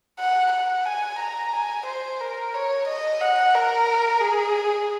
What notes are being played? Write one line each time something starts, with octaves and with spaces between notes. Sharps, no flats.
F#5
F#5
G#5
A#5
G#5
C5
A#4
C#5
D#5
F#5
A#4
G#4